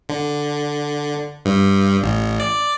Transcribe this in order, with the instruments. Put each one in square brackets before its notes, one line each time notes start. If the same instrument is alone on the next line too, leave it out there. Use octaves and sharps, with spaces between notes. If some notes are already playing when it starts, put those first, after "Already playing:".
[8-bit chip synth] D3
G2
A1
D5